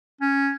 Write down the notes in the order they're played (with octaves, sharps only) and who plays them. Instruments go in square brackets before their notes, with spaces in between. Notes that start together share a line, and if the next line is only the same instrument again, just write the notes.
[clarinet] C#4